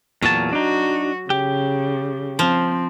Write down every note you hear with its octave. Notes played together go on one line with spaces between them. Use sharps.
E2 A#2 F#3 A5
D4 D#4 F#4
C#3 G4
F3 C4